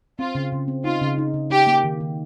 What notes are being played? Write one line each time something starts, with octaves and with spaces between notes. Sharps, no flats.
C4 F4
C#3
C#3
C4
D#4 F4
C#3
D#4
C#3
D#4 G4
A#3
D#3
D#3